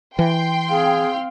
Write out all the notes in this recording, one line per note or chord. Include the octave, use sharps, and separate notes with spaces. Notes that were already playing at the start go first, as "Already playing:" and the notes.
E3 G5 C6
C4 G#4 F5